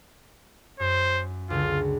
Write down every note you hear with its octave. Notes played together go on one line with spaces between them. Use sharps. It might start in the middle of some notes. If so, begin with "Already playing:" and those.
F#2 C5
C#2 D3 F4